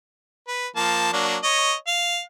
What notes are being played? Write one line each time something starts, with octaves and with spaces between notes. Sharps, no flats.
B4
F3 A#3 A5
F#3 A#3 D4
C#5 D#5
F5